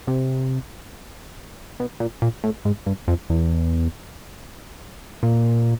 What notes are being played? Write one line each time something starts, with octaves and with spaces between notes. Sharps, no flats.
C3
B2
A#2
A#2
A2
G#2
G2
F2
E2
A#2